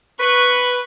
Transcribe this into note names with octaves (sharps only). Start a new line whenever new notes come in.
B4 C#6